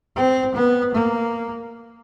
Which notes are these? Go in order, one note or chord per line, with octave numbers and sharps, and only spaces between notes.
C4
B3
A#3